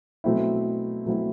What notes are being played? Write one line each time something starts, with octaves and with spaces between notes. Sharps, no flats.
B2 F#3 A3 C4 E4
B2 F#3 A3 C4 E4